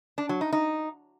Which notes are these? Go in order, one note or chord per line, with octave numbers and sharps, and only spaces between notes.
D4
F#3
D#4
D#4